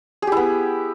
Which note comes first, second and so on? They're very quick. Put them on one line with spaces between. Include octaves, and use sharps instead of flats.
G#4 G4 E4 B3